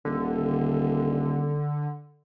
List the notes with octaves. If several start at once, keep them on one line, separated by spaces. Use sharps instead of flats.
D#1 D3